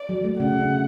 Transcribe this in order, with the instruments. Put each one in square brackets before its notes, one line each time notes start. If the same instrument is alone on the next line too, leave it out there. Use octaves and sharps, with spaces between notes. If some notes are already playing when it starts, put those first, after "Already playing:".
Already playing: [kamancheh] D5
[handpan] F#3
A3
[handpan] C#3 [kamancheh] F#5
[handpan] C#3